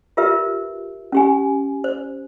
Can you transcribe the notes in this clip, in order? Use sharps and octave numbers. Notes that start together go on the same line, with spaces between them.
F4 G4 A#4 B4 E5
C#4 G4 G#5
C5